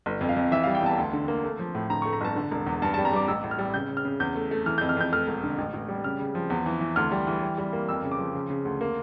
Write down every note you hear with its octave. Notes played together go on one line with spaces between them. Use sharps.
G1
F2
F5
F2
E3 E5
G3 F5
G5
E2 A5
D2
D3
A#3
A3
F3
A2
D3 A#5
A3 C#6
A#5
G1 A5
D3
E1
E2
G2 A5
G3 A5
A#5
G3 D6
A1 E6
A2
F6
G3
C#3 G6
C#3
F6
C#3
E2 G6
A3
A3
E3 F6
F2 G6
F6
F2 G6
A3 F6
E1
D3
A1
A1
G3
C#3 F6
C#3
F3
E2
E3
E3
D2 F6
G3
E3
G3
G3
A#3
F2 E6
C#3
D6
F3
C#3
C#3
D2
A#3